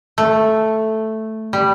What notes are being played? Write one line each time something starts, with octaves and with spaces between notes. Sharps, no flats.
A3
G3